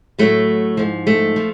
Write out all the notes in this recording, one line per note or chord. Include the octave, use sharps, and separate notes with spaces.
A2 F#3 A3
G#2 F3
A3
F3